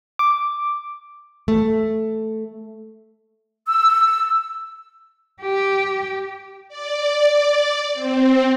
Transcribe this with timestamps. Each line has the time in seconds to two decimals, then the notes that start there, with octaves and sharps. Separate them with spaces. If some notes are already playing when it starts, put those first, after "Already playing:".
0.19 D6
1.48 A3
3.68 E6
5.42 G4
6.68 D5
7.94 C4